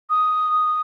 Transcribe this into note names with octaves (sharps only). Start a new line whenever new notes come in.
D#6